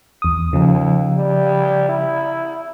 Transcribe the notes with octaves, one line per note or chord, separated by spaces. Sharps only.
E2 D#6
D#2 C#3 F3
G3
E4